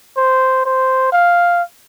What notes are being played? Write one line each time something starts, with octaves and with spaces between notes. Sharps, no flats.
C5
C5
F5